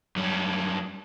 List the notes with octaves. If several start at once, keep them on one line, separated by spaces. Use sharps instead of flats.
F#2 G3